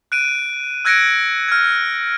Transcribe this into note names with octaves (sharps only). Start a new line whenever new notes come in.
F#6 D7 D#7
E6 F#6 G#6 A#6 C#7 D7
F6 G#6